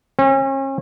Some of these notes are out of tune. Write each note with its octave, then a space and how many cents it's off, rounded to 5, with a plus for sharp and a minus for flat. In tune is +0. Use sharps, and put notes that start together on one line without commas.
C#4 -40